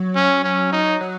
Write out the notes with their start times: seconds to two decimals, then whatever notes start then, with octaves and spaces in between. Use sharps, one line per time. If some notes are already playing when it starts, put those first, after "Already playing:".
Already playing: F#3
0.15 C#4
0.44 C#4
0.72 D#4
1.01 F#3